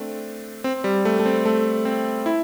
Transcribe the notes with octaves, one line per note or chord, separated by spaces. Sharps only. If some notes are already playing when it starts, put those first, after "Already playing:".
Already playing: A3 C4 D4
C4
G3
A3
A3
C4
A3
C4
E4